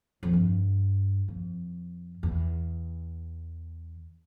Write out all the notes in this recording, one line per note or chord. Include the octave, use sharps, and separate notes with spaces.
F2
G2
F2
E2